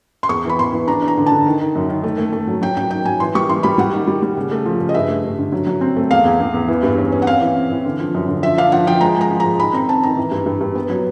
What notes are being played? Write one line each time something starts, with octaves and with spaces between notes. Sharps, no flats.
C6
E2 C#6
E3 B5
E2 C6
E3
D4 A#5
D4
A#5
D3
A5
D3
D#3
D#3
F#2
D#3
A3
A3
A3
F#3
F#3 G5
F#3 G5
D#3 G5
F#3 G#5
E3 C6
G3 C#6
E3 C6
G3 B5
G3 F#5
D#3
G3
G3
C#3
A3
F3
C#3
D#5
G2 E5
A3
G2
D3
F#3
F#3
C4
A3
E2 F5
E2
E2
E2
E3
G2
C#4
C#4
F#5
C4 F5
E3
C4
E3
D3
F3
F#2
D3
F3 E5
D4 F5
F3 F#5
F3 G5
G#3 A#5
G#3 A#5
F3
A#5
G#3
D#3 B5
C4 A#5
C4 A5
D#3 A#5
E3
G2
G2
G2
B3
F#3